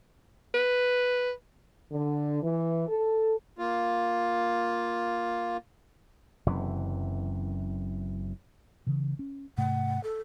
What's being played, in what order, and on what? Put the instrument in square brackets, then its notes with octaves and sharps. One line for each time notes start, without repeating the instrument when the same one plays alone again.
[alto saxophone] B4
[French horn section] D3
E3
A4
[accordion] A#3 F4
[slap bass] F#1 F#2 C3 E3
[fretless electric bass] C#3 E3
C#4
[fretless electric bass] G#2 C3 A3 [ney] F#5
[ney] A4